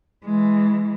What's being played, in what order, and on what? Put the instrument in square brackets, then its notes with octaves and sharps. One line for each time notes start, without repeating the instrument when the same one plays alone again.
[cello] E3 G#3